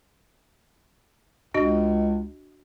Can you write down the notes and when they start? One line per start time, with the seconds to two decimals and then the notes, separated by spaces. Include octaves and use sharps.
1.54 C#2 D4 F#4 D#5